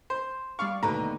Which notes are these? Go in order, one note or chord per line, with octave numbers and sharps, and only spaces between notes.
C5
G3 D5 F5 C#6
D#2 B2 D3 A3 A#5